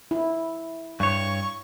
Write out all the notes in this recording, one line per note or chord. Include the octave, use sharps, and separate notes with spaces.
E4
G2 C#5 C#6